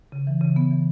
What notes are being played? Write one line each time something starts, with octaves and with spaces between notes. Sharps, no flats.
C#3
E3
C#3
B3
E3